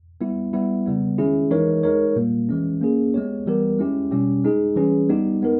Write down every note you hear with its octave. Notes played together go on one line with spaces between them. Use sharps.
G3 B3 E4
G3 B3 E4
C#3 G3 B3
D#3 G#3 C#4 E4 G#4
E3 G#3 D#4 A#4 C#5
G#3 D#4 A#4 C#5
A#2 G3 A#3
E3 G#3 C#4
A#3 C#4 G#4
G#3 B3 G4 C#5
E3 G3 B3 G4 A#4
G#3 C#4 E4 G4
B2 G3 C#4 G4
G#3 D#4 G#4
E3 G3 C#4 G#4 B4
G3 B3 D#4 G4
G#3 B3 D#4 A#4